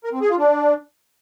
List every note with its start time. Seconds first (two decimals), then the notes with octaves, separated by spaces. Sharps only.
0.04 A#4
0.13 C4
0.21 G#4
0.30 F4
0.38 D4